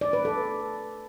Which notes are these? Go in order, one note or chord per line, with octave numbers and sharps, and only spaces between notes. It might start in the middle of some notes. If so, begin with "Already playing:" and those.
D5
B4
A4